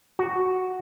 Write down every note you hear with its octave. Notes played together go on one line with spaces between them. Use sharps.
F#4